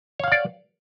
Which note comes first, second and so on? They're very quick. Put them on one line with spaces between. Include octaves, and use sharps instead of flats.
C#5 F5 F#5 D5